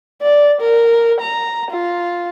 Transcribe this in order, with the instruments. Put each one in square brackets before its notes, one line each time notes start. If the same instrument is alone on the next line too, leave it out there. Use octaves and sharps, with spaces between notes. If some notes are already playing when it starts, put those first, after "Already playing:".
[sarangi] D5
A#4
A#5
F4